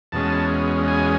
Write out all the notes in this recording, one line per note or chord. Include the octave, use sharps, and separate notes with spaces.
E2 B2 G#3 C#4 A5
G#5